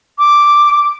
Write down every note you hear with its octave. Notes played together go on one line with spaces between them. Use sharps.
D6